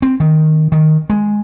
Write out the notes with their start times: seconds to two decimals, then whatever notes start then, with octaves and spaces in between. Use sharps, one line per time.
0.02 C4
0.20 D#3
0.72 D#3
1.10 G#3